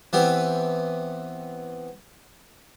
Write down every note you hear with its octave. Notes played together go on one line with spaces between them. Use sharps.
E3 B3 C4 G4